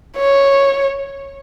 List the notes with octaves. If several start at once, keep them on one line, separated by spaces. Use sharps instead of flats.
C#5